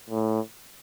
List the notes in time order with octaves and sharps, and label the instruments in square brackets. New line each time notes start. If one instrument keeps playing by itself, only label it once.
[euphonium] A2